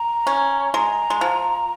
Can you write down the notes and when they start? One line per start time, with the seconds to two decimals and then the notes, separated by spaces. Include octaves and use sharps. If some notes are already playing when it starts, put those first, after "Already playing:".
Already playing: A#5
0.27 C#4
0.74 G#3 A#5
1.10 G#3
1.21 F3